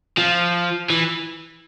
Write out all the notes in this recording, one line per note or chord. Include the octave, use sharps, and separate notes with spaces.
F3
E3